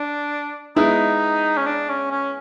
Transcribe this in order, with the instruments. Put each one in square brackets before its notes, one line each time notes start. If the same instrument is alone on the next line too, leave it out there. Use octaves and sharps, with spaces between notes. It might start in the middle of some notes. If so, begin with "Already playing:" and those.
Already playing: [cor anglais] D4
[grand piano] G#3 B3 E4 [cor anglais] D#4
[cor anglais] C#4
D4
C#4
C#4